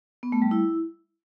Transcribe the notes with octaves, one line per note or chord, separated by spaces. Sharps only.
B3
A3
G3
E4